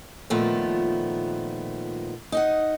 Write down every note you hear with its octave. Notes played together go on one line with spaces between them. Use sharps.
A#2 D#3 F3 A3 B3
D#4 D#5 F#5